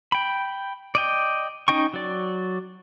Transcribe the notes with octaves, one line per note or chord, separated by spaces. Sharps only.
G5 B5
D5 D#5 G5
C#4 D#4 D#5 G5 C#6
F#3 D5